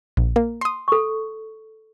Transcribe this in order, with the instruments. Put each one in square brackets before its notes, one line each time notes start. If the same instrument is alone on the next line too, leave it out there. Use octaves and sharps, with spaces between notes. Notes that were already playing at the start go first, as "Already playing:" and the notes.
[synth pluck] A#1
A#3
C6 D#6
[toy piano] A4 C#6